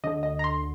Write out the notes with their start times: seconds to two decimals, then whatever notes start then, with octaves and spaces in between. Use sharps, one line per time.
0.04 D2 D3 D#5
0.23 D#5
0.39 A#5
0.44 C6